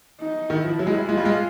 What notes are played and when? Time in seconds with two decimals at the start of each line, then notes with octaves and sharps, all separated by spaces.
0.20 D#4
0.50 D#3 E4
0.64 F3
0.79 F#3
0.87 G#3
0.94 G3
1.09 G#3 F4
1.17 G3
1.25 G#3